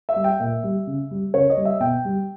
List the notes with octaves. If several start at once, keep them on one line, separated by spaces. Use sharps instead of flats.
E5
G3
G5
A#2 E5
G3
C#3
G3
C#3 C#5
D#5
G3
E5
B2 G5
G3